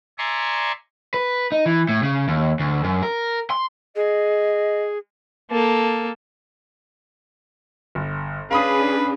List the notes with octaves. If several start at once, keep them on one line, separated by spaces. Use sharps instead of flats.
D5 E5 G#5 A#5 C6 C#6
B4
D#4
E3
A2
C#3
D#2
D2
F#2
A#4
C6
G#4 D#5
A#3 A4
G1
C#4 D4 G#4 B4 F5 B5 D#6